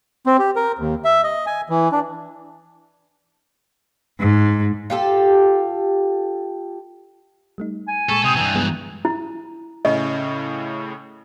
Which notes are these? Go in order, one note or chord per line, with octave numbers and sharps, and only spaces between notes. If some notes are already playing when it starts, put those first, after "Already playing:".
C4
G4
A#4
D#2
E5
D#5
G#5
E3
D4
G#2
F4 G4 A4
G3 A3 D#4
G#5
A#2 G#3 A4 C#6 B6
C3 D#6
G2 E3 G5 A#5 E6
F3 G#3 B3
E4
A2 C#3 C#4 D#5